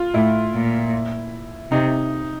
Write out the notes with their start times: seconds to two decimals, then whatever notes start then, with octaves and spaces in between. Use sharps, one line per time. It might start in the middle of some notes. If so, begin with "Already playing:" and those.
Already playing: F4
0.14 A2 E4
0.54 A#2
1.71 C3 D#4